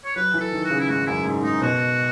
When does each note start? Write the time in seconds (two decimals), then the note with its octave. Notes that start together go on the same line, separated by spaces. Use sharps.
0.04 C#5
0.16 F#3 B4
0.34 E3
0.40 A4
0.53 D#3
0.64 F#4
0.70 C#3
0.80 E4
0.89 G#2 F#4
1.07 F#2 E4
1.26 G#2
1.42 G#2 D#4
1.62 B2 F#4